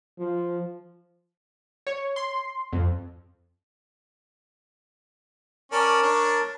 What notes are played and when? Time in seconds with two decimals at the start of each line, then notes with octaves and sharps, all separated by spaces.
0.19 F3
1.87 C#5
2.16 C6
2.72 F2
5.72 C#4 A#4 D5 A5
6.03 D4 C#5